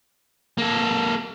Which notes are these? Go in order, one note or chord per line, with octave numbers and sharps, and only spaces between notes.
A#3 A4